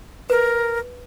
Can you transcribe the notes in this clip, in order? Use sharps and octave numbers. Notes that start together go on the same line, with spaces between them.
A#4 B4